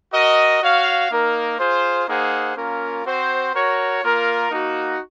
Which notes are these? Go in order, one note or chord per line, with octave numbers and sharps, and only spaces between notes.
F#4 A#4 D#5
F#4 C#5 F5
A#3 D#4 A#4
F4 G#4 C5
A#3 D#4 G#4 C5 F#5
A#3 C#4 F4 A#4
C4 F#4 C5
F#4 A#4 C#5
A#3 F4 A#4
A#3 D#4 F#4